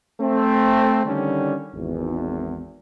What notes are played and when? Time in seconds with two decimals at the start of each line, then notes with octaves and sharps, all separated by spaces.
0.20 A3 C4
1.05 D3 D#3 G3 C#4
1.74 G#1 E2